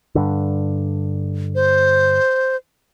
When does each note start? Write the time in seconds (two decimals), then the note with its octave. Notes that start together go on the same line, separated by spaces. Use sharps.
0.15 G2 D3
1.55 C5